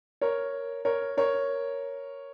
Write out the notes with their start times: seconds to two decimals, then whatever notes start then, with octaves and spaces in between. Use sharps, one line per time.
0.21 A#4 C#5
0.85 A#4 C#5
1.17 A#4 C#5